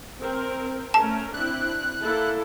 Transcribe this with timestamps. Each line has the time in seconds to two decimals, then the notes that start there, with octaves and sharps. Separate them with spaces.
0.20 C4 A#4
0.94 A3 C#4 A#4 A5
1.34 C4 D4 E4 F#6
2.01 A#3 E4 A4